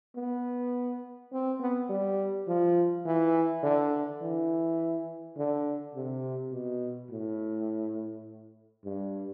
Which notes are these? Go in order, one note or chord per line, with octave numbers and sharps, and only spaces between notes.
B3
C4
B3
G3
F3
E3
D3
E3
D3
C3
B2
A2
G2